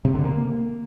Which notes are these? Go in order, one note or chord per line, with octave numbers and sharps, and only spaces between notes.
C3
D3
A#3